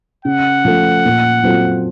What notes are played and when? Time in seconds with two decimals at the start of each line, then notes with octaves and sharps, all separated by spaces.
0.25 C#3 F#5
0.65 F3 A3
1.05 A#2
1.43 F#3 C4 F4 A4